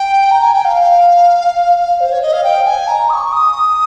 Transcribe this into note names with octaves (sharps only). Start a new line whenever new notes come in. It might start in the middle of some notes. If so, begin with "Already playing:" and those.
Already playing: G5
A#5
G#5
G5
F5
C5
C#5
D#5
F5
G5
G#5
A#5
D#6
C#6
D#6